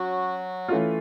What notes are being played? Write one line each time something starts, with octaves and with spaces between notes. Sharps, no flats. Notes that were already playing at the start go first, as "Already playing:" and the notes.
Already playing: F#3 C#4 F#4
E3 A3 C#4 F4